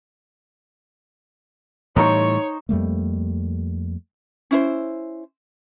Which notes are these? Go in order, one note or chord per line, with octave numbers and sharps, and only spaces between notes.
A2 E3 G3 D#4 C5 C#5 C#6
F2 G3 A3 A#3
C#4 E4 C5